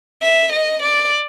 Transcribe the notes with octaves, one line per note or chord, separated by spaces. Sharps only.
E5
D#5
D5